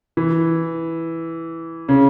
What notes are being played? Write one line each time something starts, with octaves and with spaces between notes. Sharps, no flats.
E3
C#3